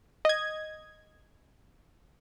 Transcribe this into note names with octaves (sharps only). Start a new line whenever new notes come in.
D#5 G#6